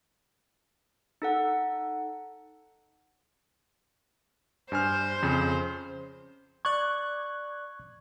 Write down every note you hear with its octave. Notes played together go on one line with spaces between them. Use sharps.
D#4 A4 F#5
G2 C5 G#5 F6
F2 C#3
D5 C#6 F#6 G#6